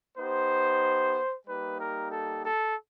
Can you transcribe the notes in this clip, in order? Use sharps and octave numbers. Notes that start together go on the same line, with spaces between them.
B3 D#4 G4 C5
G3 A#3 D#4 G4 B4
A#4
A4
A4